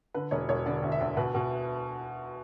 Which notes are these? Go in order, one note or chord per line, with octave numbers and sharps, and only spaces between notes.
D3 B4
E1 C#5
E1 C#5
D3 D5
D2
E5
D2
B2 B4
B2